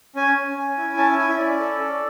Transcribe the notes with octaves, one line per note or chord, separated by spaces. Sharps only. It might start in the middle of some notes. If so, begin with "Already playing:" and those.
C#4 G#5
C#4
C#4
E4
C#4 A5
G#5
E4 G#5
E5
C#4 D5
A4
A4